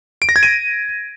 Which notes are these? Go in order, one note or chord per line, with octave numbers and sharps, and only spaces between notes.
D7
A#6
G#6
D#7